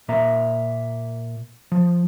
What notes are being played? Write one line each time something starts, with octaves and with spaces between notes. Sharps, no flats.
A#2 A#3 E5 A#5
F3